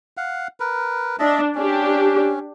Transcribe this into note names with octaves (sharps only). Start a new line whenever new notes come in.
F5 F#5
A#4 B4
D4 D#5 E5 A5
C#4 D4 G4